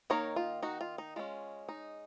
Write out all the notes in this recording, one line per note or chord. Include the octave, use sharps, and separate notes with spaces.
D#3 A#3 D#4 A#4 C#5
F4
D#4 F#4
F4
D#4
G#3 C#4 F4
D#4